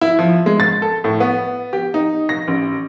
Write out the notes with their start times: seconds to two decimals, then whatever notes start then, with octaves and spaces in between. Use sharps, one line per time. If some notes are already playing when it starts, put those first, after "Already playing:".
0.01 E4
0.19 F3
0.46 G#3
0.60 A6
0.82 A4
1.04 A2
1.20 B3
1.73 G4
1.94 D#4
2.29 A#6
2.48 A1